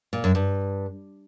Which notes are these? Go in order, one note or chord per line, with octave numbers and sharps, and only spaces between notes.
A#2
F#2
G2